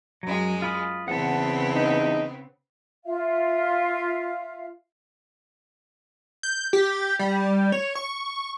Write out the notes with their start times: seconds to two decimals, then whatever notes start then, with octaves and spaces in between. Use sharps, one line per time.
0.23 F#2 F#3 G#3
0.62 F4 B5 D#6
1.08 E2 C#3 B3 C4 F#5 A5
1.75 D#4
3.06 F4 E5 F5
6.43 G6
6.73 G4
7.19 G3
7.72 C#5
7.95 C#6